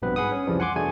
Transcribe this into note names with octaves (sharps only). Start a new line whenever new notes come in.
A#1 G2 B2 B3 C4 B4
G#2 G#4 B4 F#5 D#6
C#4
C2 F2 C#3 E3 F3 G3
F#5 G#5 C6 D6
E2 B2 A3 D4 G#4 G#5